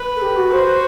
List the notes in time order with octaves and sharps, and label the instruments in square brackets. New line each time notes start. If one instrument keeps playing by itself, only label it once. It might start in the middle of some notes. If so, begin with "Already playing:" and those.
Already playing: [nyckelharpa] B4
[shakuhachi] A4
G4
F#4
[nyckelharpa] F#4 [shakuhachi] C5